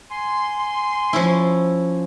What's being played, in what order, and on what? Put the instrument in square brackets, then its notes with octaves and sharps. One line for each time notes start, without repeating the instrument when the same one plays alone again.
[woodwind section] G#5 C6
[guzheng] F3 C#4 E4